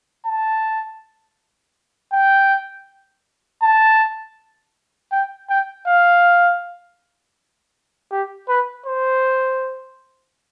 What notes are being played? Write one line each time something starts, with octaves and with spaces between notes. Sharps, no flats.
A5
G5
A5
G5
G5
F5
G4
B4
C5